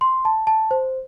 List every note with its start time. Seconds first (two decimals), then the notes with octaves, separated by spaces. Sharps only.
0.01 C6
0.25 A5
0.47 A5
0.71 C5